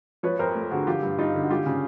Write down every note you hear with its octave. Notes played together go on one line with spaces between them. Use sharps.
F3 B4 C#5
F2 A#4 C5
A3
D3 F#4 G#4
F3 F4 G4
G2
G2 D#4 F4
D3
F#4
G3 F4 G4
C#3